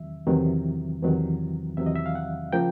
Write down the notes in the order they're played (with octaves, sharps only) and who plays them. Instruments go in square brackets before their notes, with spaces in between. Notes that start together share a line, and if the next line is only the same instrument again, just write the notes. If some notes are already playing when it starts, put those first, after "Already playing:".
Already playing: [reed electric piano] E2 C3 D#3 F#3 E5
E2 C3 D#3 F#3
E2 C3 D#3 F#3
E2 C3 D#3 F#3 E5
D#5
E5
F5
F#5
C#3 F3 A#3 G5